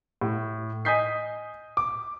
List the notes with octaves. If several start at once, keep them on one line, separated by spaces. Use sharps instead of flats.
A2
D#5 G#5 D#6 G6 B6 C7
D6